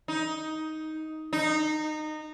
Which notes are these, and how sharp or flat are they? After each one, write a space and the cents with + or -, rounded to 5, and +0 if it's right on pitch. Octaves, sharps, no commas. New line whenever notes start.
D#4 +10
D#4 -20